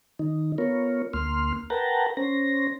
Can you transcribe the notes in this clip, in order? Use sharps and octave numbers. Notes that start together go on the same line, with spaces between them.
D#3 D#4
B3 F4 A#4 C#5
D2 A#3 C6 F6
A#4 B4 F#5 G5 A5 A#5
C#4 C5 A#6